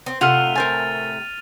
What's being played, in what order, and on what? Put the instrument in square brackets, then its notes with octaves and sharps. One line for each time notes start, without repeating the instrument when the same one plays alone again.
[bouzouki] C4
[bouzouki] A2 C3 A3 [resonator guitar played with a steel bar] F4 F#5 [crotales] F6 D#7 F7
[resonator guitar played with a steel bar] A#4 C5 G#5 [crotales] F6 A6